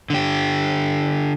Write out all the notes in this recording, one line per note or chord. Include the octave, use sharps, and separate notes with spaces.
D3 G4